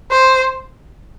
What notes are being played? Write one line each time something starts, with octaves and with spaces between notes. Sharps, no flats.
C5